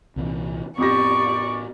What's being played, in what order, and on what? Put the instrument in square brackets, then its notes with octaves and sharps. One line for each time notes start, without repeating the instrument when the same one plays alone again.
[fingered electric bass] C2 A#2 E3
[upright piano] F2 G4 A#6 [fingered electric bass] A2 B3 [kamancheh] D5 C#6